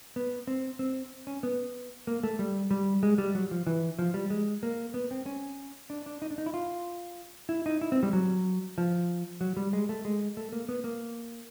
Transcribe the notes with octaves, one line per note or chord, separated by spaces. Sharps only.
B3
C4
C4
C#4
B3
A#3
A3
G3
G3
G#3
G3
F#3
F3
E3
F3
G3
G#3
A#3
B3
C4
C#4
D4
D4
D#4
D4
D#4
E4
F4
E4
D#4
E4
C4
G3
F#3
F3
F#3
G3
G#3
A3
G#3
A3
A#3
B3
A#3